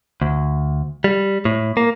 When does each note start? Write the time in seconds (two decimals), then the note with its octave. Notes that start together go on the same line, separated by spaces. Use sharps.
0.22 D2
1.04 G3
1.45 A2
1.77 A#3